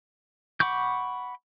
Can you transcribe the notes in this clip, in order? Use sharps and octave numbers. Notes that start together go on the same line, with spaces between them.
F#5 B5 C#6 D6 G6